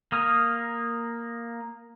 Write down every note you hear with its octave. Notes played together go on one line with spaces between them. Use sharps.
A#3 D#6 F6